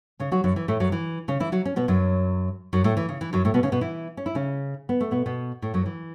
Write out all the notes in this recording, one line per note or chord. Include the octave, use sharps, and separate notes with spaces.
C#3 C#4
F#3 F#4
F#2 F#3
E3
A2 A3
F#2 F#3
E3
C#3 C#4
E3 E4
F#3 F#4
C#4
B2 B3
F#2 F#3
F#2 F#3
A2 A3
E3
C#3
E3
F#2 F#3
A2 A3
B2 B3
C#3 C#4
B2 B3
E3 E4
C#4
E4
C#3 C#4
B3
A3
B2 B3
B2 B3
A2 A3
F#2 F#3
E3